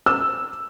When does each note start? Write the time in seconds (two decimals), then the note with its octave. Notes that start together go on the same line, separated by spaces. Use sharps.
0.06 E6